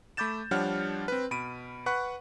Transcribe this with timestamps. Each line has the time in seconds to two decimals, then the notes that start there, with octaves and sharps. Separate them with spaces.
0.17 A3 B5 D6 G6 A6 E7
0.51 F3 G3 D4 C#5 F#5 F6
1.08 C4 B4
1.31 B2 B5 D7 D#7
1.86 B4 F#5 B5 C#6 F#6